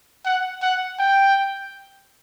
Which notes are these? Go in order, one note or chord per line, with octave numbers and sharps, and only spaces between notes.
F#5
F#5
G5